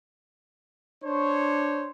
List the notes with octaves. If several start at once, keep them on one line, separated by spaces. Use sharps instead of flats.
D4 C5 C#5